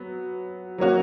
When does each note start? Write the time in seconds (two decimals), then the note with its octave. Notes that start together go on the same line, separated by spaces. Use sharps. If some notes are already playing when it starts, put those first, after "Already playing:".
Already playing: F#3 B3
0.78 F#3 A#3 C#4 F#4